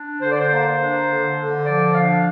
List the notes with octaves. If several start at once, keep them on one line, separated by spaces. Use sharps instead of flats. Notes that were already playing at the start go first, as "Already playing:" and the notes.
Already playing: D4
D3 C5
D5
C5
A#3
D4
D3
D3
F3 D5
D4 F5